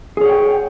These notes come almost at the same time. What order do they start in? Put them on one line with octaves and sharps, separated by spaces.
G#4 C#5 F#5 G5